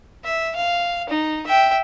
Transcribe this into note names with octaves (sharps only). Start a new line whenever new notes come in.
E5
F5
D#4
E5 G5